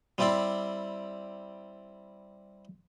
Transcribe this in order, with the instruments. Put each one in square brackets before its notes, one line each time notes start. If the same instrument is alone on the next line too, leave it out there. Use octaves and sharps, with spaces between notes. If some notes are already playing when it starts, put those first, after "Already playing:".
[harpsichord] G3 C4 E4 G4 D5 C6